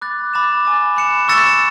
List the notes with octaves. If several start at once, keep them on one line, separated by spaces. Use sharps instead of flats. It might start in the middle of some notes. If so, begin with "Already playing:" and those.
B5 D6 F#6 A6
B5 D6 A6 E7
G#5 D6 A6
B5 F#6 C#7 E7
C#6 E6 A6 C#7 E7